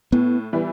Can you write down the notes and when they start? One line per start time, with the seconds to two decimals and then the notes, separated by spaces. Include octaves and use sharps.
0.12 A2 B3
0.53 E3 G3 B3 E4